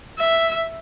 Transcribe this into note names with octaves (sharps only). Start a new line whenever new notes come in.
E5